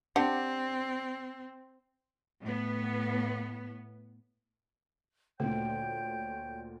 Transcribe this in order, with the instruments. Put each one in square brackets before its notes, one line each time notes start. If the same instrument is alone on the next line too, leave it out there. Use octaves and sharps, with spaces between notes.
[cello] C4 [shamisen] D4 G4 F#5
[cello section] A2 B3
[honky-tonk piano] D2 A#2 [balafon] A3 [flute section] C#5 G5 G6